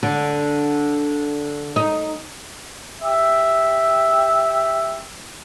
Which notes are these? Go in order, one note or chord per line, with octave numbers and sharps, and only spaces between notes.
D3
D#4
G4 E5